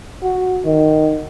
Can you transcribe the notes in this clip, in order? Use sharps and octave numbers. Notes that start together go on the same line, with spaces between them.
F#4
D#3